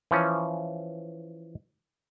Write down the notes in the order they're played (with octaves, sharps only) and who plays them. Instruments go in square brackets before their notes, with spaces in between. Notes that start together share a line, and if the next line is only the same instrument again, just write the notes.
[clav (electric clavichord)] E3 F3 C#4